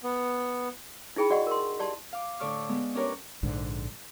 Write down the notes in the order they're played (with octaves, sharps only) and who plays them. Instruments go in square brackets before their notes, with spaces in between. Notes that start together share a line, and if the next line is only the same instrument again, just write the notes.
[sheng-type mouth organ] B3
[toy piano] D#4 E4 G#4 G5 B5
F#4 D5 D#5 F#5 C#6
A#4 C6
G4 D5 A5 C6
[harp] F5 D6
A2 D3 A4 D5 C#6 F6
G#3 B3
C#4 D4 G4 A#4 B4 C#5
[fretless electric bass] A#1 G#2 D3